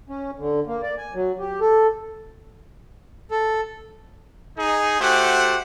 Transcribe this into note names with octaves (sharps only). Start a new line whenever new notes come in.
C#4
D3
A#3
D5
G#5
F#3
G4
A4
A4
D#4 G#4
A3 F#4 G4 C5 F#5